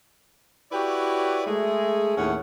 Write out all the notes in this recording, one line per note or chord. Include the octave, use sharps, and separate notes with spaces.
E4 F#4 G4 B4 C#5 D5
G#3 A3 G#4
D#2 A2 A3 C#4 G#4 F#5